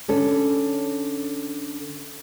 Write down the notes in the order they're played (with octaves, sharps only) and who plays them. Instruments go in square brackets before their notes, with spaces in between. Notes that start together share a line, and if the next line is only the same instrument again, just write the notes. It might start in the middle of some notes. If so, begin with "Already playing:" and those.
[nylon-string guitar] D3 C#4 A4